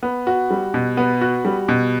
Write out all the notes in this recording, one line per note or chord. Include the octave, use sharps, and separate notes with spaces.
B3
F#4
G3
B2
B3
F#4
G3
B2